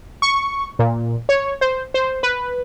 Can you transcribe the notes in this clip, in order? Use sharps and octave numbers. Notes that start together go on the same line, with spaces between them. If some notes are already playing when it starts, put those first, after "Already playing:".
C#6
A#2
C#5
C5
C5
B4